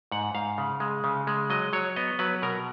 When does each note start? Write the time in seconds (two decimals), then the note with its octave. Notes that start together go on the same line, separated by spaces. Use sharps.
0.12 G#2 F#5
0.35 G#2 F5
0.58 C#3
0.80 G#3
1.04 C#3
1.27 G#3
1.50 F#3 D#5
1.73 F#3 C#5
1.96 B3 D#5
2.19 F#3 B4
2.42 B2 A#4